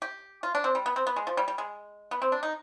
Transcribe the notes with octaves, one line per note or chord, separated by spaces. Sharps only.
G4
F4
D4
C4
G3
B3
C4
B3
G#3
F3
G3
G3
G#3
B3
C4
D4
D#4